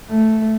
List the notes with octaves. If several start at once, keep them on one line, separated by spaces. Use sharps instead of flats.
A3